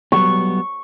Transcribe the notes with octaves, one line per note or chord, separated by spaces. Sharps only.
F#3 G3 B3 C#6